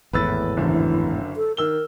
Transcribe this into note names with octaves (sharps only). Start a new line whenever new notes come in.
G#1 E2 A2 B4 E6 A6
F#1 F#2 D3 E3
A4
D#3 A#4 E6 G7